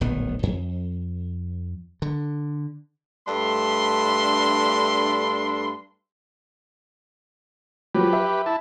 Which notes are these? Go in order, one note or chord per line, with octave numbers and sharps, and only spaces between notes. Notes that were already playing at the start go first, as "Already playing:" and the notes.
D1 A#1 D#3 B3
F2
D3
G2 A3 D4 A4 B5 C6
F3 F#3 G4 B4
E5
E4 A5